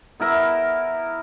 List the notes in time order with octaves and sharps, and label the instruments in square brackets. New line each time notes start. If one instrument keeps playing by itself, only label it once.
[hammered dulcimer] B3 E4 A#4 E5